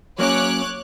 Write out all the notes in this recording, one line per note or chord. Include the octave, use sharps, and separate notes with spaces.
F#3 A#3 C#4 C#5 D6 F#6